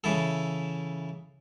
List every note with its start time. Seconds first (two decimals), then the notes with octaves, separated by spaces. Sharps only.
0.04 C#3 E3 E4 A4